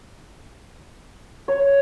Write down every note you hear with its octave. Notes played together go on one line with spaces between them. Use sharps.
C#5